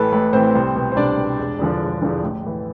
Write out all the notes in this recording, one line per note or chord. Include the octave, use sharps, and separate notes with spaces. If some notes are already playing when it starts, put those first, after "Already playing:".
Already playing: A1 A2 E3 A4 B4
A1 B4
A2 E3 C4 C5
C2
B2
C5
C2 D4 D5
B2
E1
E2 D3 F3
E1
E2 D3 F3
A1
A2 E3